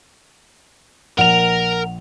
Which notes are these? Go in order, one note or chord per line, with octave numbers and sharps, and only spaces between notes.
A#1 A#4 F#5 A#5 F7